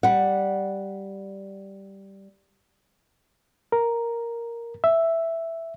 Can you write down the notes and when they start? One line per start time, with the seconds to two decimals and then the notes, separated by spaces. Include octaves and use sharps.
0.03 G3 F#5
3.72 A#4
4.84 E5